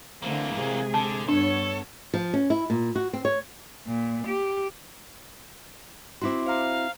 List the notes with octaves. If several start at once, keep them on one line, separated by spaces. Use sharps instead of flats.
D3 E3 A3 A#3 C4
C3 G#3 G#4
D3 A5
G2 B3 D4 A4 C#5
F3
C#4
E4
A#2
F#4
C4
C#5
A#2
G4
C4 E4 F#4 C6 D6
C5 F5 A#5